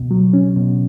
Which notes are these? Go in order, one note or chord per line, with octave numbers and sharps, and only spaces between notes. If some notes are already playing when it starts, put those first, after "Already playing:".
Already playing: C#2 B2
F#3
C#4
B2